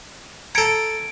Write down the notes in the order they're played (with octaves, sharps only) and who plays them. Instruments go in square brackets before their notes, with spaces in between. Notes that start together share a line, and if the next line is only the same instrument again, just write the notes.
[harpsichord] A4 A#5 [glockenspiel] G#6 C#7 D7